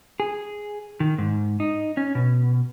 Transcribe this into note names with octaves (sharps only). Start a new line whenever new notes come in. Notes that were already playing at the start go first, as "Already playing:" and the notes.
G#4
D#3
G#2
D#4
C#4
B2